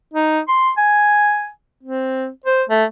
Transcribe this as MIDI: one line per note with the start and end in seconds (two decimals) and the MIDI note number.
0.14 0.40 63
0.48 0.71 84
0.77 1.49 80
1.83 2.28 60
2.46 2.63 72
2.69 2.84 57